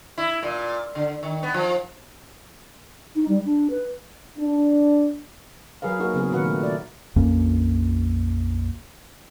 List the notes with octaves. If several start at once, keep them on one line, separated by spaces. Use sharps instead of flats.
E4
A#2
D3
D#3
B3
F3
D#4
G3
D4
B4
D4
F#3 G#4 A#4 B4 F5
A#3 D#4 F#4 G#4 A#4
C#3 F#3 B3 C4 G#4
A#2 D#3 F#4 A#4 B4 F#5
A3
A3 D5
A#1 F2 A#3 C#4